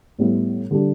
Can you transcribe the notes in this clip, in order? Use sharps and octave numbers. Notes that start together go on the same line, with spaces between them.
A2 G3 B3 E4
D3 G3 D4 G4